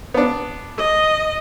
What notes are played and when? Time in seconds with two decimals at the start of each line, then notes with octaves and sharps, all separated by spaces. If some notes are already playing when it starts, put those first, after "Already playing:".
0.14 B3 D4
0.77 D#5